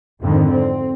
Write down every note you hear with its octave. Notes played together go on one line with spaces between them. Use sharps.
F2 G#2 D3 D#3
C4